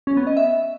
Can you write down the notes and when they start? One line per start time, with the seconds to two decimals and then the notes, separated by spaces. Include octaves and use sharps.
0.07 C#4
0.17 B3
0.27 D#5
0.37 E5